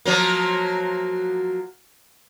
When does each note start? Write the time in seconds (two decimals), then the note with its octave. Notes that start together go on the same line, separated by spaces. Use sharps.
0.05 F3 F#3 A#3